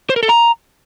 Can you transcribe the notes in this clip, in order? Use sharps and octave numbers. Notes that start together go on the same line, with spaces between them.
C5
A#4
A4
A#5